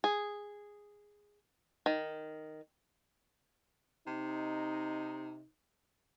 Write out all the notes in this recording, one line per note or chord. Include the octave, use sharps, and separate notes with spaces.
G#4
D#3
C3 D#4